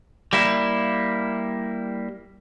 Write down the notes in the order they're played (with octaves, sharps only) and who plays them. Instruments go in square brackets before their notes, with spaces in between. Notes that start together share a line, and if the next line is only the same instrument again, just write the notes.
[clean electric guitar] G3 A#3 E4